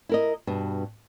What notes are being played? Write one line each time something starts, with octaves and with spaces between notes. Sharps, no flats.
E4 A#4 D#5
G2 B2